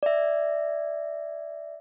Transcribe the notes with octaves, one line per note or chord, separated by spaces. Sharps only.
D5 E5